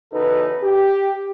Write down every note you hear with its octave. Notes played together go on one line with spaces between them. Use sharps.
E2 C#3 D#4 F#4 A4 B4
G4